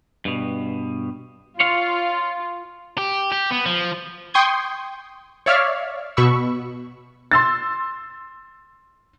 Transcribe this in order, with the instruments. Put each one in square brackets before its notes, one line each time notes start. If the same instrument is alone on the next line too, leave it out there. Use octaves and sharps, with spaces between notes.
[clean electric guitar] G2 B2
[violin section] F4 [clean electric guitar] C#5 F5
[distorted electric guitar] G4
G4
B3
F3
[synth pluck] G5 C6 C#6 D#6 G6 G#6
C#5 D5 E5 F5 F6
B2 B5 C#6 E6
[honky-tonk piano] C6 E6 A6